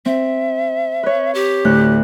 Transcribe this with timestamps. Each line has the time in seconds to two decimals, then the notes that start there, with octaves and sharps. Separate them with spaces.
0.06 C4 E5
1.03 B4 C#5
1.34 G4
1.65 D2 A2 F#6